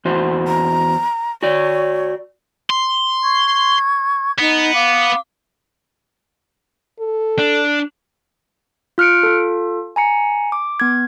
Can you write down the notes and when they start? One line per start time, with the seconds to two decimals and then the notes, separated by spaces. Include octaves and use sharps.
0.05 E2 F#4 C5
0.48 A#5
1.43 F#4 C#5 D5
2.70 C6
3.23 C#6 G#6
4.39 B3 D#4
4.74 F5 D6
6.99 A4
7.39 D4
8.98 F4 F6 F#6 C#7 D7
9.23 F4 A4
9.96 G#5 A#5 C#7
10.52 D6
10.80 B3 G#6